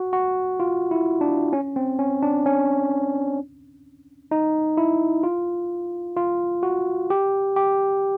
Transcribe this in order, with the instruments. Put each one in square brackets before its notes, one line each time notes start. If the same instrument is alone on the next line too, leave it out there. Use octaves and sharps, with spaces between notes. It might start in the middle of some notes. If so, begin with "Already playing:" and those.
Already playing: [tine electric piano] F#4
F#4
F4
E4
D4
C#4
C4
C#4
D4
C#4
D#4
E4
F4
F4
F#4
G4
G4